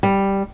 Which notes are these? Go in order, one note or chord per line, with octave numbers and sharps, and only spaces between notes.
G3